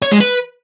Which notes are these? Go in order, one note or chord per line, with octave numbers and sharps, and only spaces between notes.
C#5
G#3
B4